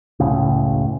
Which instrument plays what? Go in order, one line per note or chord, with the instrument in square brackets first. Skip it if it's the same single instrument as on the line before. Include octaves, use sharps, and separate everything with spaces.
[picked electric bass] F#1 C#2 A2 C#3